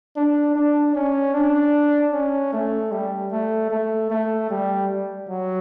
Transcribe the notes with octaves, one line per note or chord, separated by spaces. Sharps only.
D4
D4
C#4
D4
C#4
A3
G3
A3
A3
A3
G3
F#3